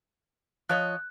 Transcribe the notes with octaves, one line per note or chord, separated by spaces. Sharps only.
F3 C#5 D#5 F#6